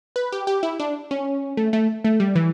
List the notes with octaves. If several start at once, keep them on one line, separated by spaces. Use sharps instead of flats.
B4
G4
G4
E4
D4
C#4
A3
A3
A3
G3
E3